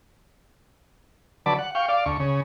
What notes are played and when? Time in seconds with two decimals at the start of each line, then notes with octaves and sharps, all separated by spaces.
1.46 D3 F#3 B4 D5 A5
1.59 F#5
1.75 F5 G5 C#6
1.89 D5 F5
2.06 D2 C#6
2.20 C#3